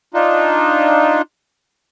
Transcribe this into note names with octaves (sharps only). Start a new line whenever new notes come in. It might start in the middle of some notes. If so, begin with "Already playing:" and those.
D4 D#4 F4